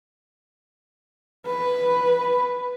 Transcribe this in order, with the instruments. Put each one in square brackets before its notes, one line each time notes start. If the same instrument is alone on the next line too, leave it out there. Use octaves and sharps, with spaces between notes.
[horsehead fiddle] B4